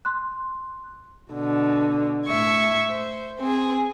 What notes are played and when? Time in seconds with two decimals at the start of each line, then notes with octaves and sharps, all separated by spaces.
0.05 C6 F#6
1.33 B2 D3
2.26 A2 E5 C#6 G#6
2.90 C5
3.39 C4 G#4